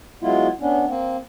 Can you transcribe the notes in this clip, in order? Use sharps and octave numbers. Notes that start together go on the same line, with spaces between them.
F#3 G#3 B3 E4 F4
B3 C#4 D4
A#3 C4